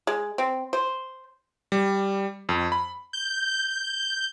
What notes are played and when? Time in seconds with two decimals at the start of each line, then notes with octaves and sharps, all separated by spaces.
0.07 G#3
0.38 C4
0.73 C5
1.72 G3
2.49 F2
2.72 B5
3.13 G6